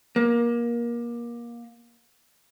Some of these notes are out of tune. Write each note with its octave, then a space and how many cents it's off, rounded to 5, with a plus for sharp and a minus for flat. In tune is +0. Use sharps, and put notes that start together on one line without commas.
A#3 +25